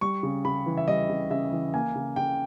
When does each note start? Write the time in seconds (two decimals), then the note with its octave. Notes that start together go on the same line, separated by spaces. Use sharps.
0.01 G3 C#6
0.23 C#3
0.45 C#3 B5
0.66 E3
0.77 E5
0.88 G3 D#5
1.09 C#3
1.30 C#3 E5
1.52 E3
1.74 A#3 G#5
1.96 C#3
2.16 C#3 G5